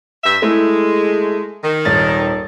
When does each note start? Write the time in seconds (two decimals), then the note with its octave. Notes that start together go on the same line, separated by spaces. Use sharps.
0.24 G2 E5
0.42 G#3 A3 E4
1.63 D#3
1.85 D#1 A6